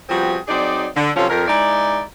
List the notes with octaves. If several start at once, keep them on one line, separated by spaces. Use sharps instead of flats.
F3 G3 B3 C4 F#4 G#4
F#3 C4 D#4 G#4 D5
D3
C3 F3 F#3 C#4 F4 A4
F2 A#4
G#3 D#4 E4 D5